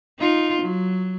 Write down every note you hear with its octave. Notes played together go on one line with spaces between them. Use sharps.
D#4 F4
F#3